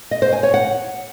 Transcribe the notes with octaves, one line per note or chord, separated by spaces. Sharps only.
D#5
C5
G#5
C#5
F#5